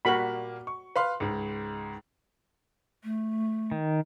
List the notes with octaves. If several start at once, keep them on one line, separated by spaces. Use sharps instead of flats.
A#2 G3 A#3 F#4 B5
C#6
B4 F5 C6
C#2 G#2
A3
D#3